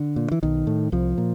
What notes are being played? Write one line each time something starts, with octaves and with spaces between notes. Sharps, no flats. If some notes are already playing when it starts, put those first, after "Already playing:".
Already playing: D3
A#2
E3
B1 D#3
A2
C2 F3
A#2